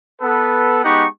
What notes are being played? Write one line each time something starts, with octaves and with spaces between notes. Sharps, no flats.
B3 A4 B4
G#3 B3 D#4 G4 F#5 C#6